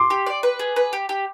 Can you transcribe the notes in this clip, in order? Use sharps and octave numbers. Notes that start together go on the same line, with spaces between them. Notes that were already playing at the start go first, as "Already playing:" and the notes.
Already playing: C6 D6
G4
D5
B4
G#4
B4
G4
G4